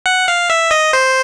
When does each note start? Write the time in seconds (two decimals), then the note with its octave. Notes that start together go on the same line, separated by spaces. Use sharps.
0.06 F#5
0.28 F5
0.50 E5
0.71 D#5
0.93 C5